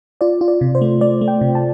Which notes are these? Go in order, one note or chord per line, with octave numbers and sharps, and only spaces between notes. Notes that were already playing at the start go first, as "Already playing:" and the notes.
F4 D5
F4
D5
C3
C5
A3
A3 D5
A3
G5
C3
A5